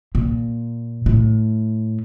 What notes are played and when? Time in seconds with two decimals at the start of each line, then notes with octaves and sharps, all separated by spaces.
0.15 A#2
1.06 A2